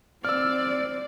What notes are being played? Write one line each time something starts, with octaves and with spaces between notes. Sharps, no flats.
C4 D5 E6 F6